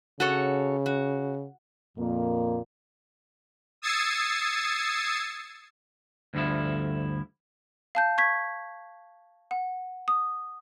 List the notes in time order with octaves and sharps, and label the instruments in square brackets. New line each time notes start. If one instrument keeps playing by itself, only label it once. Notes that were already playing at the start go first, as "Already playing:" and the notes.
[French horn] C#3 [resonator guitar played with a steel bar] F#4 A4 C#5
[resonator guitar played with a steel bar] F#4
[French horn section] F2 A#2 A#3
[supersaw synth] D#6 E6 G#6 A6 C7 C#7
[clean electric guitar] D2 G2 D3 F3 E4
[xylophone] F5 A5 G6
C#6 G#6 B6
F#5
D#6